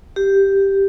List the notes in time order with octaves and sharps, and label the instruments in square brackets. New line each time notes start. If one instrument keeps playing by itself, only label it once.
[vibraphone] G4